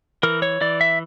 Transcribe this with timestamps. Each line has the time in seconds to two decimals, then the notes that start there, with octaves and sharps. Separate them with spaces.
0.23 E3 A#4
0.42 C#5
0.61 E3 D5
0.81 E5